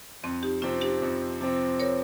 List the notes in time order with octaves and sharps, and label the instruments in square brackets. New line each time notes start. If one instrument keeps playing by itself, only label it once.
[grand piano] F2 [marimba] C4
[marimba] D#4 G4
[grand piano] C3 F3 C4 [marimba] C#4 F4
[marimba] D#4 G4
[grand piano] F2
C3 F3 C4
[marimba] A#4 C#5